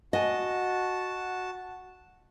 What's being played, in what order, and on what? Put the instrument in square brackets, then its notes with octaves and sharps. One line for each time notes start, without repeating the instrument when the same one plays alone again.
[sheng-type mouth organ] F#4 A5 [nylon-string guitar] D#5 G#5